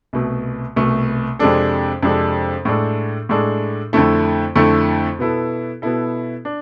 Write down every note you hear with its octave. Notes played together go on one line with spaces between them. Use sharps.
C2 B2 A3
C2 B2 A3
F2 C3 G#3 D4 A4
F2 C3 G#3 D4 A4
A2 G#3 D4 A4
A2 G#3 D4 A4
F2 D3 A3 E4 A4
F2 D3 A3 E4 A4
B2 B3 E4 A4
B2 B3 E4 A4
D4